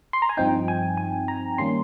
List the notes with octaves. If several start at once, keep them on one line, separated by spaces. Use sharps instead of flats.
C6
A#5
G#5
G2 F3 C4 D#4 G5
G#5
G#5
A#5
D#3 G3 A#3 C#4 C6